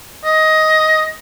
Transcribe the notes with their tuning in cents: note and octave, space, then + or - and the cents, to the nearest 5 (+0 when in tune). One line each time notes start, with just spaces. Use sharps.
D#5 +15